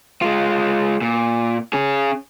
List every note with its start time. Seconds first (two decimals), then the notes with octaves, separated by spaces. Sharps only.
0.22 G#3 F4
1.02 A#2
1.73 C#4 G#4